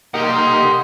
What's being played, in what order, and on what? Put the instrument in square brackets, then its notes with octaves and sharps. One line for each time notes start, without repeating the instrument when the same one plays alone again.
[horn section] G3 G4 [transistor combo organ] A#3 D#4 [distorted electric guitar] F#5 C6